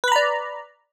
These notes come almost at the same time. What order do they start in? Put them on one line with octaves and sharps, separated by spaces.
B4 B5 A#5 D5